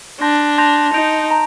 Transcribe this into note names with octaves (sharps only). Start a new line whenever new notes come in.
D4 A5 C6 G6 A#6
A5 C6 G6 A#6 F7
D#4 G6 A#6 D7 F7
A#5